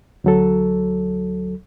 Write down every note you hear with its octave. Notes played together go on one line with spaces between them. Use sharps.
D2 F#3 A4